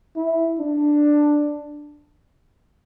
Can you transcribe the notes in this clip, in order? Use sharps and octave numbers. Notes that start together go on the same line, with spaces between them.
E4
D4